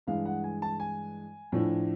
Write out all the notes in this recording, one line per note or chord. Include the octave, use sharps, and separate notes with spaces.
G2 E3 G#3 F5
F#5
G#5
A5
G#5
A2 F3 A3 D4